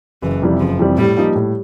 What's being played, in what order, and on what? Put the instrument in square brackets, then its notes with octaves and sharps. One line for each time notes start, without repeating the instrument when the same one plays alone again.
[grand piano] F#1 [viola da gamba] E3
[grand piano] F2 C3 E3 G3
[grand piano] F#1 [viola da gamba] F3
[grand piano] F2 C3 E3 G3
[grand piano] A2 [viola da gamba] G3
[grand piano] F3 A#3 D#4
A2